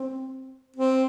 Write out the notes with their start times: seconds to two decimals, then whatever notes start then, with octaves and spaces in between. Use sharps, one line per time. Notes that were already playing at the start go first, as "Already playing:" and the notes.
Already playing: C4
0.77 C4